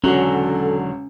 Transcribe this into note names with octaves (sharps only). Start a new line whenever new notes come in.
E1 D3 F#3 C#4 F#4 A4